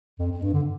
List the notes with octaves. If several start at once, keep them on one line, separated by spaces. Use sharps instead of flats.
F2
F2
G2
D3